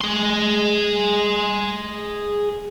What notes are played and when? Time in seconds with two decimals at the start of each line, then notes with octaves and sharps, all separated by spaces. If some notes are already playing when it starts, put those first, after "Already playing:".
0.01 G#4 C6